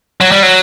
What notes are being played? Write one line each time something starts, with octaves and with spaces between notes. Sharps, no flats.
F#3
G3
F#3